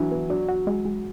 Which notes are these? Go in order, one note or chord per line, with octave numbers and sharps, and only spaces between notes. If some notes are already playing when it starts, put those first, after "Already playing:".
Already playing: E3 F#3 D4
B3
F#3 D4
F#4
G#3
G#3